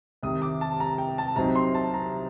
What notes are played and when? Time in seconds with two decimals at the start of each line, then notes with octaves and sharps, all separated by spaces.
0.23 C2 C3 D#3 D#6
0.42 D6
0.61 A5
0.80 A#5
0.98 G5
1.18 A5
1.36 C2 C3 F#3 C4 D#4 A#5
1.56 C6
1.74 A5
1.94 A#5